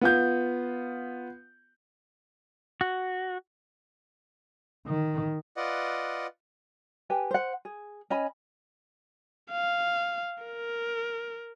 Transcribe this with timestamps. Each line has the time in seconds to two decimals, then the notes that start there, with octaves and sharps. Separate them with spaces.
0.01 B3 F4 G6
2.81 F#4
4.87 D#3
5.56 F4 B4 D5 D#5 F#5
7.10 G4 B4 G#5
7.31 C5 F#5
7.65 G#4
8.10 C#4 D#5 G#5 B5
9.51 F5
10.43 A#4